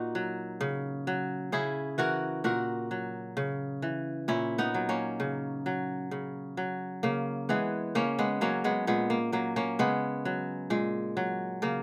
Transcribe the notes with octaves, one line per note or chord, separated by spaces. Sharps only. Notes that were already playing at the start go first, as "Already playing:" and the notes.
Already playing: A#2 D#4 F#4
F#3
C#3
F#3
C#3 E4 G#4
E3 F#4 A#4
A#2 F#4 A#4
F#3
C#3
E3
A#2 C#4 E4
B3 D#4
F#3
A#3 C#4
C#3
F#3
C#3
F#3
C#3 A#3
E3 G#3 B3
C#3 A#3 C#4
G#3 B3
F#3 A#3 C#4
G#3 B3
A#2 G#3 B3
A#3
F#3 A#3
A#3 C#4
C#3 G#3 B3
F#3
A#2 G#3
F#3
C#3 A#3